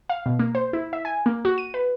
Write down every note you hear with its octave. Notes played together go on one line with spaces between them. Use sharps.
F5
B2
A#3
C5
E4
E5
G#5
A#3
F#4
D#7
B4